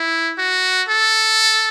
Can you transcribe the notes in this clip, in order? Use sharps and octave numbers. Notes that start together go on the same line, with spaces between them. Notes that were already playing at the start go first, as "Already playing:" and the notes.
Already playing: E4
F#4
A4